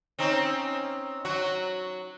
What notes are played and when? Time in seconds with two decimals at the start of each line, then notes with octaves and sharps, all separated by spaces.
0.19 C4 C#4 D#4
1.25 F#3 F#4